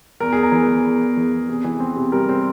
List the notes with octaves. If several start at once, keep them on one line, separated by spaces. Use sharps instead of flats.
E2 A#4
E2 G#4
A#4
E3
E3
E2
E2
E3
E2
C3 G#4
E3
C4
C3
G3 A#4
C4